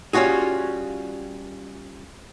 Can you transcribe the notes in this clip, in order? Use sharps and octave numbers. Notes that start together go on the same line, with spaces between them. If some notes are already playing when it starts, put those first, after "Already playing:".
G3 C#4 F4 F#4 G#4